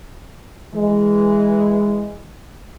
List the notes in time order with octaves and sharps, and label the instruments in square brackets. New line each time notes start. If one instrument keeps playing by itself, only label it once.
[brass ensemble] E3 G#3